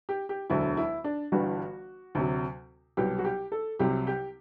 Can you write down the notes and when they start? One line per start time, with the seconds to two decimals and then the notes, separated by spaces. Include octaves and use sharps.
0.09 G4
0.29 G4
0.50 E1 D2 D3 F#3 E4
0.77 E4
1.04 D4
1.32 G1 G2 E3 G3 F#4
2.15 D2 C3 F#3
2.97 C2 B2 F#3 G4
3.18 F#4
3.25 G4
3.52 A4
3.79 C2 C3 F#3 G4
4.07 G4